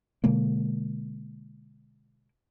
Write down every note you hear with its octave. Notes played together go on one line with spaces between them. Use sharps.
B2 D3 G#3 A#3